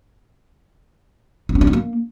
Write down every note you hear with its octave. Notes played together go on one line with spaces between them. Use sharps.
D#4
C#4
D4
D#4
A#3